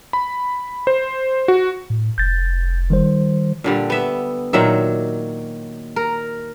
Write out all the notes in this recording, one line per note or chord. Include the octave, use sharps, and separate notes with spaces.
B5
C5
F#4
A2
F1 G6 A6
D#3 G3 C5
A#2 D3 G3
B3 E5
A#2 D#3 F#3 E5
A#4